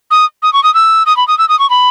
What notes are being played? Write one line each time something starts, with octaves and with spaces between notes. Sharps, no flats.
D#6
D#6
C#6
D#6
E6
D#6
B5
D#6
E6
D#6
C#6
B5